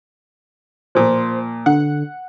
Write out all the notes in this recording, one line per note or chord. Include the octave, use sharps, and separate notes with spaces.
A#2 F3 C5
D3 F#5